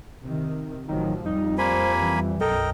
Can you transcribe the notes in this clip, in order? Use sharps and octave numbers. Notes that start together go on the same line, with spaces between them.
C3 D#3
A1 D#3 F3 F#3
F2 G3 D#4
A#3 C5 G#5 B5
E3
B1 F#2 A4 A#4 D#5 G5